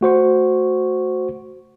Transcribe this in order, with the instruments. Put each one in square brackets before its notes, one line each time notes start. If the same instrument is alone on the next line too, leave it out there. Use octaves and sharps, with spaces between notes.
[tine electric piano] A3 F#4 C5 C#6